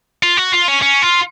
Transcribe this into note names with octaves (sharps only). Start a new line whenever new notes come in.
F4
F#4
F4
C#4
C#4
F4